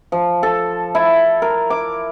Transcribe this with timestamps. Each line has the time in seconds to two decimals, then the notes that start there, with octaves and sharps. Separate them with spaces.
0.12 F3
0.43 A4
0.95 E4
1.42 A#4
1.70 D6